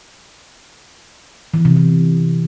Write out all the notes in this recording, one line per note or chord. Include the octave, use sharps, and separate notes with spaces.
E3
C3
C3